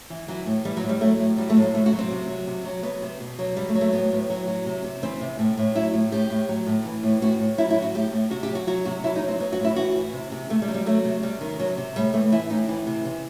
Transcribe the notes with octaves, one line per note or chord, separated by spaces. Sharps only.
E3
E3 F#3
A2
E3 G3
F#3
A2
G3
F#3 A3
A2
F#3 G3
A3
A2
F#3
C3 A3
F#4
F#3
C4
C3
F#3
C3
F#3
F#3 B3
C3
B2
F#3
F#3 G3
A3
F#3
A3
A2 B3
A2
F#3
F#3
C3
C3
E3 C4
C3
A2
A2
F#3 E4
A2
A2 G4
A2
F#3
A2
E3
A2
A2 F#4
A2
F#3 E4
E4
F#3
F#4
A2 G4
A2
C3 F#4
G4
F#3
F#4
F#3 F#4
C3 F#4
F#3 E4
D#4
F#3
C4
F#3 B3
F#4
A2
E4
E3 F#4
E3
C3
C3
C3 A3
G3
F#3
G3
F#3 A3
C3
C3 G3
D#3
C3 F#3
C3
A2 G3
E3 A3
E3 E4
A2 D#4
E3
C3
C3